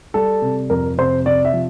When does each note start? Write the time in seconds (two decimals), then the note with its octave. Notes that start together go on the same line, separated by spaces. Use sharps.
0.14 G3 A4
0.42 C3
0.70 F2 A#4
0.98 C3 C5
1.26 C3 D5
1.45 E5
1.53 F3